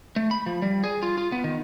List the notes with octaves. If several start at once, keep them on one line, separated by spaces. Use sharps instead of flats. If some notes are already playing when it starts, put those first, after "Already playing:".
A3
B5
F3
G3
G#4
F4
F4
B3
D#3